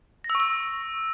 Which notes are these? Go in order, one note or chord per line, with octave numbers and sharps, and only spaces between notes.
A#6
E6
C#6
E6